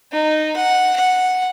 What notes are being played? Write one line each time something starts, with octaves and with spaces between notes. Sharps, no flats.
D#4
F#5
F#5